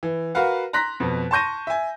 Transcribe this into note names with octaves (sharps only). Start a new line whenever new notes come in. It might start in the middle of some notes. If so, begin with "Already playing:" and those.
E3
F#4 A#4 B4 F5 F#5
A#5 C6 F#6 A#6 B6
F2 B2
A5 C6 C#6 G6 A#6 D#7
E5 G#5